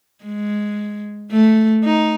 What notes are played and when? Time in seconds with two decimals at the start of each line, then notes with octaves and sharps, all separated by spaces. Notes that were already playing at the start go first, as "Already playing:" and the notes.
0.24 G#3
1.32 A3
1.85 D#4